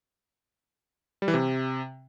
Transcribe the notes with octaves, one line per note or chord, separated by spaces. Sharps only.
G3
E3
C3